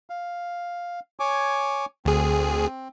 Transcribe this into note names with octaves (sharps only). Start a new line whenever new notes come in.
F5
C#5 G#5 D6
D2 C4 G#4